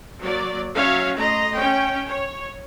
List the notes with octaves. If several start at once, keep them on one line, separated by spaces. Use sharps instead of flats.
F#3 A#3 D5
F#3 C#4 F#4 C#5 E5 F5
A3 D#5 A#5 C6
C#4 G5
C#5